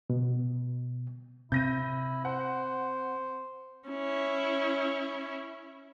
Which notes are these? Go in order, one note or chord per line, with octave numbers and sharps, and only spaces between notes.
B2
C3 C4 E4 G6 A#6 D#7
C5 F#5
C#4 E4